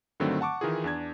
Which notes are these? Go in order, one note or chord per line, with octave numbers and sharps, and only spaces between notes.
G2 D3 D#3 F#3 A3 C4
F#5 A5 C#6 D6
D#3 E3 D#4 F4 G#4
E2 D4 G#6